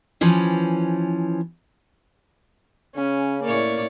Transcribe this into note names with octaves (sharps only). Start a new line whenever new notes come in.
E3 F3 C#4
C#3 C#4
A2 A#3 C#5 D5